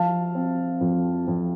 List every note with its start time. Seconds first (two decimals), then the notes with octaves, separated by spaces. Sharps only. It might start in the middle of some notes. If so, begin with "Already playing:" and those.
Already playing: F3 F5 A5
0.35 C4
0.81 F2
1.28 F2